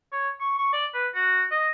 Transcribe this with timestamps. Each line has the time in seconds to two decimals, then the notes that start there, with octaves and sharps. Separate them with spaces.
0.12 C#5
0.40 C#6
0.58 C#6
0.73 D5
0.94 B4
1.15 F#4
1.51 D#5